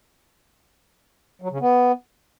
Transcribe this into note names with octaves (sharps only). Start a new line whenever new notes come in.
F#3
C#3
B3